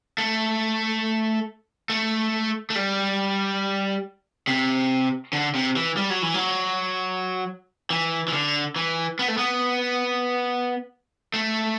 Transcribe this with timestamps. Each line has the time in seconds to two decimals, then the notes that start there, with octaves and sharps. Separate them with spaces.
0.18 A3
1.90 A3
2.70 A3
2.76 G3
4.47 C3
5.33 D3
5.55 C3
5.76 E3
5.97 G3
6.10 F#3
6.22 E3
6.34 F#3
7.90 E3
8.28 E3
8.33 D3
8.76 E3
9.19 B3
9.28 A3
9.37 B3
11.34 A3